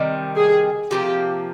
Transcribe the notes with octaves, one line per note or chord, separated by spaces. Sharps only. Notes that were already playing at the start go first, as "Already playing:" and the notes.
Already playing: C3 D#3 G3
G#4
C3 F3 A#3 G4